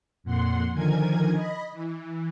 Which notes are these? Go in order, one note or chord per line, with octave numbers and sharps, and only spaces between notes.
F2 A#2 F#5 C6
D3 D#3 F3 A#4 G#5 G#6
D#5 B5
E3